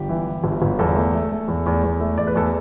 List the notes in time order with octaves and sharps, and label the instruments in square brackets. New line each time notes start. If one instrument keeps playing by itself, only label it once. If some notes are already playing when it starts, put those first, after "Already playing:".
Already playing: [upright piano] G1 G4
E3
E3
G1
G1
E2 A4
A3
A3
A3
E2
E2
E2
A3
E2 D5
B4
E2 A4